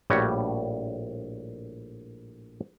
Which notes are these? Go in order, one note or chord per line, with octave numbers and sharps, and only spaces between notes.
A#1 A2 G3 F#4 C#5